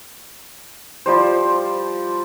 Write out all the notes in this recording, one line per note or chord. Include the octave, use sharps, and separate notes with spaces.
F3 G3 C5